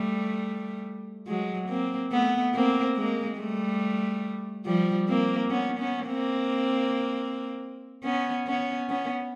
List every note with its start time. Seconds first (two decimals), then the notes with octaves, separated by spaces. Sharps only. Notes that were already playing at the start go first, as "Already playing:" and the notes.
Already playing: G3 A3
1.27 F#3 G#3
1.69 A#3 C4
2.12 A3 B3
2.54 A#3 C4
2.97 G#3 A#3
3.38 G3 A3
4.66 F3 G3
5.08 A#3 C4
5.50 B3 C#4
5.79 B3 C#4
6.07 A#3 C4
8.04 B3 C#4
8.47 B3 C#4
8.89 B3 C#4